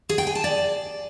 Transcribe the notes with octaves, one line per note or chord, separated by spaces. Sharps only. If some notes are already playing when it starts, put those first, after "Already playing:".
G#4
G5
G#5
A5
D5